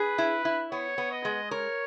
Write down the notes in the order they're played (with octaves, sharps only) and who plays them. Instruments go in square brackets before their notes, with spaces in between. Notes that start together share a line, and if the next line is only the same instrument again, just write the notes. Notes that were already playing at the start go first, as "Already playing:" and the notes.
Already playing: [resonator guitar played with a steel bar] G#4 [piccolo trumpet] B4
[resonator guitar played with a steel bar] E4
E4
[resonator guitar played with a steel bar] B3 [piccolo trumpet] C#5
[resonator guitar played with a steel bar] B3
[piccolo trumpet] D#5
[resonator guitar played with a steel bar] G#3
[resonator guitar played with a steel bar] A#4 [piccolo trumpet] C#5